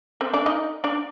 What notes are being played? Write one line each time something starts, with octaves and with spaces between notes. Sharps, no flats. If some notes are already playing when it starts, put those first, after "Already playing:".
C4 C5
D4 D5
D#4 D#5
D4 D5